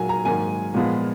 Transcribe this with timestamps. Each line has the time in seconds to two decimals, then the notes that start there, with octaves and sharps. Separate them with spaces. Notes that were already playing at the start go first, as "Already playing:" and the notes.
Already playing: A#2 F#3 A#3 G#5
0.09 A#5
0.25 G#2 D#3 F#3 A#3 G#5
0.74 A#2 F3 G#3 B3